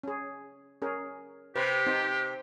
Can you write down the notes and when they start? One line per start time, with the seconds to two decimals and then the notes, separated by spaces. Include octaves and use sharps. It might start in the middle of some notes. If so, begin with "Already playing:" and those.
0.03 C#4 G#4
0.82 C#4 G#4 A#4
1.56 C3 G4 B4
1.87 C4 D#4 C5